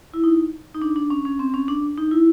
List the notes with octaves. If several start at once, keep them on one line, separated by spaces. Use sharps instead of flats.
E4
D#4
D#4
D4
D4
C#4
C#4
C4
C#4
D4
D#4
E4